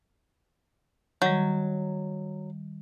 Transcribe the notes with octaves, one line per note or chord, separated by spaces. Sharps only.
D#3 F#3 G3